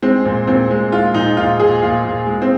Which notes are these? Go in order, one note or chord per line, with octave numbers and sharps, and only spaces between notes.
G#3 C4
A#2
A#2 C4
G#3
G#3 F4
A#2 D#4
A#2 F4
A#2 G#4
A#2 F4
A#2
G#3
C4